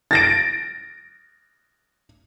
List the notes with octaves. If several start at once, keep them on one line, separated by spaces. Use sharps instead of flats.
A6 A#6 D7